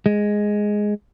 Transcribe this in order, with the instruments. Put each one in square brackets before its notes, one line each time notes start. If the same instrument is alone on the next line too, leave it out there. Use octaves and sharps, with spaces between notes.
[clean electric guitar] G#3